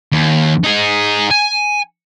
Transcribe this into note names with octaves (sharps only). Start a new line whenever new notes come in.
D#2
D#4 G#4
G#5